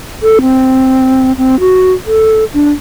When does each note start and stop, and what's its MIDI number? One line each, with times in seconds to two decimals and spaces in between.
0.23 0.39 69
0.41 1.32 60
1.38 1.56 60
1.60 1.92 66
2.07 2.44 69
2.54 2.70 62